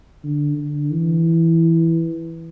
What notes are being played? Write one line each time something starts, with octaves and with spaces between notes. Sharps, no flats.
D3
D3
E3